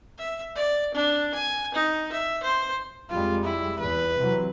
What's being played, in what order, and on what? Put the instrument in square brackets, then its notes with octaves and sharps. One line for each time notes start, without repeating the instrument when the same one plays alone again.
[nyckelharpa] E5
D5
D4
G#5
D#4
E5
C5
[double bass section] F2 G3 G#3 [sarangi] F4
[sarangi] E4
[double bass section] E2 [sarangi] B4
[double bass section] C3 E3 F#3